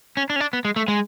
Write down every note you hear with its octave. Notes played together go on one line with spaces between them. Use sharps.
C#4
D4
C#4
D4
B3
G#3
A3
G#3